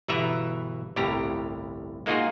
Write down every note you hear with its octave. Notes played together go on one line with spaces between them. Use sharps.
G1 B2 E3 B4 E5 A#5
G1 C2 A2 G4 A#5
G#3 A#3 D#4 F4 F#4 G#4